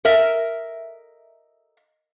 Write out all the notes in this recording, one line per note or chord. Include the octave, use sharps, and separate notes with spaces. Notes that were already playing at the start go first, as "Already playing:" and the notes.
A#4 D#5 E5